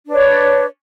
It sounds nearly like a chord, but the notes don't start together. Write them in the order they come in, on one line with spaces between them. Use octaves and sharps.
D4 B4 C#5